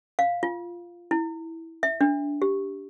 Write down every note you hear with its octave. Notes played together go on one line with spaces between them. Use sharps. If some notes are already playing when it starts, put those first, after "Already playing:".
F5
F4
E4
E5
D4
G4